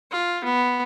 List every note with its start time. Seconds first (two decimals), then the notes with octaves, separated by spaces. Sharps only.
0.11 F4
0.44 B3